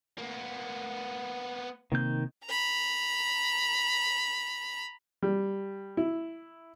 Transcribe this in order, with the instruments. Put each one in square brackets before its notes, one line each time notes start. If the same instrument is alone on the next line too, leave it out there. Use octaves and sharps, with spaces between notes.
[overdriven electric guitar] A#3 B3
[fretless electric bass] C3 A#3 C4 [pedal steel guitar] D#3 G6
[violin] A#5 B5
[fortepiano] G3
E4